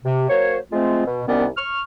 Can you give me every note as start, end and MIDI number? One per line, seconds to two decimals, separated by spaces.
0.04 0.25 48
0.28 0.57 54
0.28 0.57 58
0.28 0.57 72
0.28 0.57 73
0.72 1.05 53
0.72 1.05 56
0.72 1.05 57
0.72 1.05 60
0.72 1.05 65
1.05 1.23 47
1.28 1.47 36
1.28 1.47 51
1.28 1.47 59
1.28 1.47 61
1.28 1.47 74
1.57 1.80 85
1.57 1.80 89